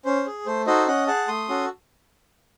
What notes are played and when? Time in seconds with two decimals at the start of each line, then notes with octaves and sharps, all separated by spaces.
0.05 C#4 C5
0.26 G#4
0.46 A3 C5
0.66 D#4 F#4 A4 C5 D#5
0.87 C#4 D#5 F#5
1.07 G#4 F#5 A5
1.28 A3 C6 D#6
1.49 C#4 F#4 A4